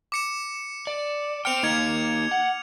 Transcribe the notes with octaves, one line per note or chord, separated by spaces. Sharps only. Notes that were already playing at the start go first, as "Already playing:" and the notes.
D6 C#7 E7
D5
C5 G5 F6 C#7 F7
A#3 D#4 D#5 F6 G#6 C#7
F#5